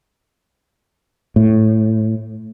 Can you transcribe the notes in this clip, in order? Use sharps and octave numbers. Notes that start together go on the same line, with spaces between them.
A2